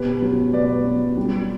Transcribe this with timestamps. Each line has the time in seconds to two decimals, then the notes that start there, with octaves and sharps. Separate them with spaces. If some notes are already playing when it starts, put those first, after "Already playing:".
Already playing: B2 G4 B4
0.22 F#3
0.53 B2 B4 D5
0.85 F#3
1.17 G3